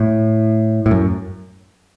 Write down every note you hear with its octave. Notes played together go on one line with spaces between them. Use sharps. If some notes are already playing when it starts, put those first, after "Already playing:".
Already playing: A2
A2
F#2